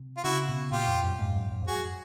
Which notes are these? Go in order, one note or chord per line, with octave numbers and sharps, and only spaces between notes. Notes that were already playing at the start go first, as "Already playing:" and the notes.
Already playing: C3
F4
C#3 E4 F#4
B2
A#2 F4 G4
F2
F#2
G#2
F#2
F#2
F2
F#2 F#4 G#4